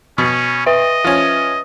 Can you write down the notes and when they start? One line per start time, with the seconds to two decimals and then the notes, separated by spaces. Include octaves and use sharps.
0.18 B2 C#4
0.66 B4 D#5 E5
1.04 F3 C#4